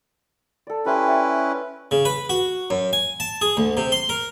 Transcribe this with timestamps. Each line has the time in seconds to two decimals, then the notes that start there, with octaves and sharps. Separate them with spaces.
0.67 A4 D5
0.86 G3 C#4 E4 B4 E5 C6
1.08 D5 E5 F#5
1.91 C#3
2.05 B4
2.29 F#4
2.70 F#2
2.93 G#5
3.20 A5
3.41 G#4
3.57 D2
3.77 C3
3.92 C6
4.09 A#4